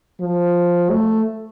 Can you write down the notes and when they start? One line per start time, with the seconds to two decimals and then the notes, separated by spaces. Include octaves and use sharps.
0.21 F3
0.91 A3